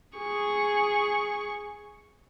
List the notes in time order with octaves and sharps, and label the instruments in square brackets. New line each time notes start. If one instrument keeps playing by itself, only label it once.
[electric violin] G#4 C#6